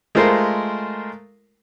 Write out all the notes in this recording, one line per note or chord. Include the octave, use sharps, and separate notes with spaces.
G#3 A3 F4 A#4 C5